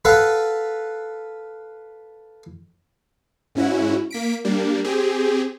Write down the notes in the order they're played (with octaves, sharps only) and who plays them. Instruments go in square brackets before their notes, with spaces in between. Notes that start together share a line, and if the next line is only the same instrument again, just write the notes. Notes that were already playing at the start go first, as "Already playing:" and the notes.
[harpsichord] A4 B4 F5 F#5
[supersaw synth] G#2 C#4 E4 F#4
A#3 B6 D7
G3 A#3 D4
C4 G4 G#4